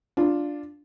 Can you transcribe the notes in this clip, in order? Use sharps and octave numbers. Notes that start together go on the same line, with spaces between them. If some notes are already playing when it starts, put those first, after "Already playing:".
D4 F4